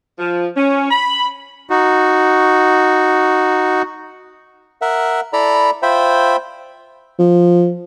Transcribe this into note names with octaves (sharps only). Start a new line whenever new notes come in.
F3
C#4
B5
D#4 F#4
A#4 E5 F#5
E4 A4 D5 A#5 B5
F4 C5 E5 G5 B5
F3